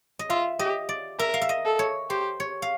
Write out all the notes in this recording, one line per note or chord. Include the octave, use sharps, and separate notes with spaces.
D#5
F4 E5
G4 D#5
D5
A#4 E5
F5
E5
D#5
A4
C#5
G4 C5
C#5
F5